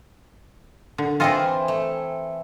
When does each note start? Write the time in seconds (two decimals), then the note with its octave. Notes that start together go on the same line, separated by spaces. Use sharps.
0.98 D3
1.20 E3 C4 F4 G#4 A4 D#5
1.68 A3